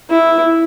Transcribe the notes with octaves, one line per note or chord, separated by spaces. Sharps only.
E4